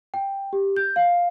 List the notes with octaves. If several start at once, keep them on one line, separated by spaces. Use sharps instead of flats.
G5
G4
G6
F5